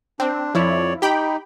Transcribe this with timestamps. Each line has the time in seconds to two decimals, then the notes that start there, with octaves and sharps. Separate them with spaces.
0.20 C4 D4
0.55 F2 F3 E4 C#5 D5
1.02 D#4 G4 G5 B5